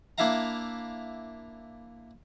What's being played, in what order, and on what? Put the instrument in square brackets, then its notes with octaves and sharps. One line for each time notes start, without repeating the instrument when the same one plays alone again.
[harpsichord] A#3 D4 E4 E5 F5 A#5